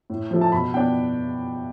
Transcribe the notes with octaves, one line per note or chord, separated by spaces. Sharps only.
A2
F3 A3
A5
B2 B5
B3 D4 G5